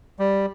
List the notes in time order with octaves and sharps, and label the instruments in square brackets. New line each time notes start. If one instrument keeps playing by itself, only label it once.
[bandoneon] G3